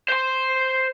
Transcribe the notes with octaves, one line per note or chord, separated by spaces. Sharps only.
C5 C6